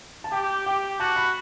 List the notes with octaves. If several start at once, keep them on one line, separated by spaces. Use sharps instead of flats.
A5
G4 G5
G4 G5
F#4 A5
B5